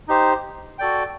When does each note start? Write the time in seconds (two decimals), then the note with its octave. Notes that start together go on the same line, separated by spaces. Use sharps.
0.08 D#4 G4 C5
0.79 F#4 A4 D5 G5